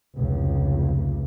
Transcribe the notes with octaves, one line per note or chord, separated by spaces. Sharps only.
F1 C#2